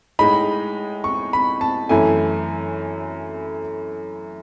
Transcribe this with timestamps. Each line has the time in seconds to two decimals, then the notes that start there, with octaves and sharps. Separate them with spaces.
0.19 A2 G#3 D#4 B5
1.04 C#6
1.33 B5
1.61 A5
1.89 F#2 E3 A3 E4 G#5